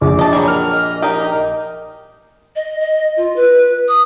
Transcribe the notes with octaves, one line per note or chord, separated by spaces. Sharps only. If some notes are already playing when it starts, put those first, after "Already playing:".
A#1 D6
D#5 A5
F#3 G3 G#4
A#4 F6
D#5
D#4 G4 A#4 D#5
D#5
D#5
F4
B4
D#6